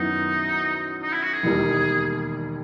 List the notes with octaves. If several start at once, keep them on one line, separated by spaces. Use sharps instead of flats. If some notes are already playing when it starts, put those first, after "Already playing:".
Already playing: F#2 D#3 F#3 B3 D#4 E4
D#4
E4
F#4
G#4
E1 D#2 D#3 G3